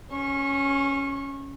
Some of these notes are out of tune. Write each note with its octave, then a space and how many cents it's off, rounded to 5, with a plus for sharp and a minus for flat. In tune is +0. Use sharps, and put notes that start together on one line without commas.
C#4 +0 C#6 -30